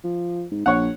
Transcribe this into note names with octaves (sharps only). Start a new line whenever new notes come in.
F3
G#2
A#1 C#5 F#5